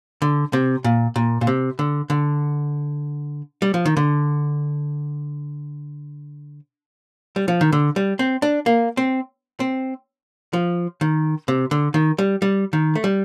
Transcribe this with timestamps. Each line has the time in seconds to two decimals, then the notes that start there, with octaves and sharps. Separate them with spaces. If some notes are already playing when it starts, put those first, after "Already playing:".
0.22 D3
0.53 C3
0.84 A#2
1.16 A#2
1.41 A#2
1.47 C3
1.79 D3
2.10 D3
3.62 G3
3.74 F3
3.85 D#3
3.97 D3
7.36 G3
7.48 F3
7.61 D#3
7.73 D3
7.96 G3
8.19 C4
8.42 D4
8.66 A#3
8.97 C4
9.60 C4
10.53 F3
11.01 D#3
11.48 C3
11.71 D3
11.94 D#3
12.18 G3
12.42 G3
12.73 D#3
12.95 A3
13.04 G3